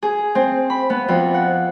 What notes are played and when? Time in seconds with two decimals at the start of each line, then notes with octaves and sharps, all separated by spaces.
0.03 G#4
0.35 C4
0.70 B5
0.90 B3
1.08 F2
1.34 F#5